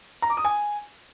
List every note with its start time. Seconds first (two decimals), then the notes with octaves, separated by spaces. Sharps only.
0.22 A#5
0.30 D6
0.37 D#6
0.45 G#5